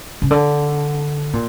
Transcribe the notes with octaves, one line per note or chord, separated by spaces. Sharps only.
C#3
D3
A#2